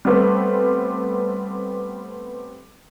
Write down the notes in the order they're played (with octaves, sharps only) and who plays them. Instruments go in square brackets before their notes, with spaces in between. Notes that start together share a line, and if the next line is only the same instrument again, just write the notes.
[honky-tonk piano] G3 A3 B3 C4